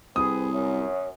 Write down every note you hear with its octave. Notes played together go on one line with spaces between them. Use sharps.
C2 C4 G#4 B4 D#6
F#2 C#5